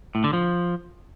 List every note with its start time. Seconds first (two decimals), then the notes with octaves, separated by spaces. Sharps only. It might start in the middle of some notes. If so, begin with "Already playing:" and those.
0.15 A2
0.24 D3
0.33 F3